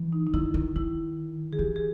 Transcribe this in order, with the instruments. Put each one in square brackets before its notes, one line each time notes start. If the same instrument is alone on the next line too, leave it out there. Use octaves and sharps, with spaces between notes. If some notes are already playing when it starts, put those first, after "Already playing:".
Already playing: [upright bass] E3
[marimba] D#4
D#4
[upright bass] D#3 [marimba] E4
[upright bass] D#3
[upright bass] D#3 [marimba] E4
[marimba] G#4
[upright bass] E3 [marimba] G4
[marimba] G#4